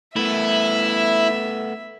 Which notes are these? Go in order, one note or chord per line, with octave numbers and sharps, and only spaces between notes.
A3 B3 E4 E5